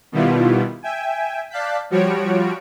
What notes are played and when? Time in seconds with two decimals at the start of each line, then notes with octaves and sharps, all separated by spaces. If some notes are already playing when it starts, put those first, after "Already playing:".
0.12 B2 D#3 G3 B3 E4 F4
0.83 E5 G5 G#5
1.50 D5 F5 A5 F#6 G6 B6
1.90 F3 G3 F#4 C#5 D7